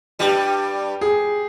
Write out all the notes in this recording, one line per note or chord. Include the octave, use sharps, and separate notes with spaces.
G2 G3 G4
G#4